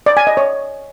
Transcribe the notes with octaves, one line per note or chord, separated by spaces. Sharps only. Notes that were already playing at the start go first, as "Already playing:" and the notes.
D5
G#5
D#5
C#5